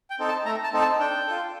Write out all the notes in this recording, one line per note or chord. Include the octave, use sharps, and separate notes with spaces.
G5
C4 D#4 A4
A5
A3 A#5
A5
C4 D#4 A4
A5
D4 G5
F4 A4